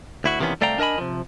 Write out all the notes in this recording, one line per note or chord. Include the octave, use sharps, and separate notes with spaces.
D2 E4 F#4
C3 D#3 E3 A#3 B3 C#4
C2 A3 D5 F5 G5 A#5
D4 A#4 D#5 G#5 B5
C3 F3